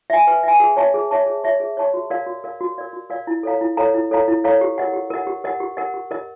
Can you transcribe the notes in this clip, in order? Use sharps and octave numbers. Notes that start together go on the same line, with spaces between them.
E5 G#5
B4
E5 G#5
G#4
C#5 E5 A5 C#6
G#4
C#5 E5 A5 C#6
G#4
C#5 E5 A5 C#6
G#4
C#5 E5 A5 C#6
F#4
A#4 D5 F5
F#4
A#4 D5 F5
F#4
A#4 D5 F5
F#4
A#4 D5 F5
E4
A4 C#5 F5 A#5
E4
A4 C#5 F5 A#5
E4
A4 C#5 F5 A#5
E4
A4 C#5 F5 A#5
G4
A#4 D#5 F#5
G4
A#4 D#5 F#5
G4
A#4 D#5 F#5
G4
A#4 D#5 F#5
G4
A#4 D#5